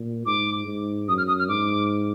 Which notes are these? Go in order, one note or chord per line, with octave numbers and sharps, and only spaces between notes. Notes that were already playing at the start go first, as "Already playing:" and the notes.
Already playing: A#2
G#2 D6
G#2
F#2 D#6
F6
D#6
F6
G#2 D6